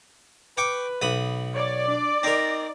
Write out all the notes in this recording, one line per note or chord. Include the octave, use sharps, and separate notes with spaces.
B4 G5 C#6 D6
B1 B5 D#6
C#5 D5
D4 D6
C4 D#4 A#4 A#6